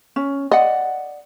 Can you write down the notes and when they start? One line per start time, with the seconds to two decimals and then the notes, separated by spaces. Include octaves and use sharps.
0.16 C#4
0.52 D5 D#5 F#5